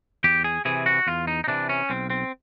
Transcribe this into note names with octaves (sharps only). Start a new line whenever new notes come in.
E2 G4
G#4
C3 E3 G#4
F#4
E2 F4
D#4
D#4
C3 E3 D4
C#4
B1 C4
C4